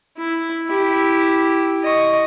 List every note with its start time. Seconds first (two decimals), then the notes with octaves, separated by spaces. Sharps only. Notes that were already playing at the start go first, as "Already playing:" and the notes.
0.18 E4
0.68 E4 G4
1.84 D#5 C#6